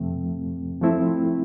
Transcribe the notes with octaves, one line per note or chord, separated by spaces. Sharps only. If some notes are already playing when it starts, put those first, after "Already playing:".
Already playing: F2 C3 F3 A3 C4
F3 A3 C4 E4